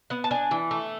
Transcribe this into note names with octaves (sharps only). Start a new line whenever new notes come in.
B3 F#5
A5
D4 G#5
E3
A3